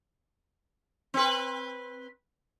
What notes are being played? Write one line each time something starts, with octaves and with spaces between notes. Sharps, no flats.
C4 B4